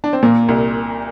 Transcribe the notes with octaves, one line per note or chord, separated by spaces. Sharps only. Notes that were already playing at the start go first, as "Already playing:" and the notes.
D4
C4
A#2 A#3
C2